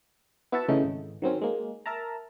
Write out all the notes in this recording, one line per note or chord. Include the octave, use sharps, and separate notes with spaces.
B3 E4 F#4 E5 F#5 A5
C#3 E3 A3 D#4
G#1
D#3 F#3 C4 C#4
G#3 A#3
A#4 E5 A5 A#5